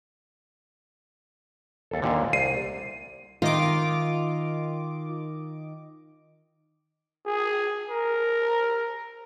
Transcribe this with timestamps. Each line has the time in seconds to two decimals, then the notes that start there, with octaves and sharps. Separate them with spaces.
1.91 D#2 A4
2.02 D#2 A#2 D3
2.33 C2 C7 D#7
3.42 D#3 F4 D#5 D6
7.27 G#4
7.90 A#4